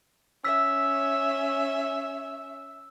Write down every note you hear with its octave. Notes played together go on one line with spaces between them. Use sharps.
C#4 E5 E6 B6